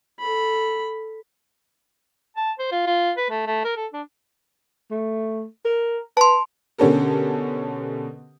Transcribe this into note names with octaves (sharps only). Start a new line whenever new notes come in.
A4 B5
A5
C5
F4
F4
B4
A3
A3
A#4
A4
D4
A3
A#4
B4 A5 C6
B2 D3 C#4 G4 A4 A#4